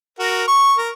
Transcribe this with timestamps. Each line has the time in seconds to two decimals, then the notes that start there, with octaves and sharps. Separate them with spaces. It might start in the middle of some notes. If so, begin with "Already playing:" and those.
0.19 F#4 A#4
0.48 C#6
0.78 A#4